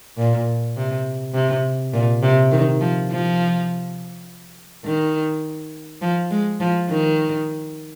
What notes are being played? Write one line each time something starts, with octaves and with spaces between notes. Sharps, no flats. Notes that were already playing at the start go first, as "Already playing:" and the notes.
A#2
C3
C3
A#2
C3
D#3
F3
F3
D#3
F3
G#3
F3
D#3